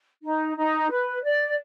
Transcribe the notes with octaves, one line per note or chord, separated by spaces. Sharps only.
D#4
D#4
B4
D5